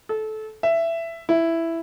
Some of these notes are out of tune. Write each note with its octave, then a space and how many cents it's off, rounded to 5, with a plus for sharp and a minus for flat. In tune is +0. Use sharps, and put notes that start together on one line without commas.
A4 -20
E5 +15
E4 +5